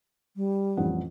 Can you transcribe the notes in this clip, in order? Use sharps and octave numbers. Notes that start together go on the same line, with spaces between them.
G3
A1 F2 F#5